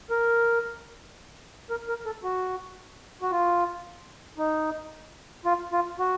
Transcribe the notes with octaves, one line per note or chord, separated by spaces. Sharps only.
A#4
A#4
A#4
A4
F#4
F#4
F4
D#4
F4
F4
F#4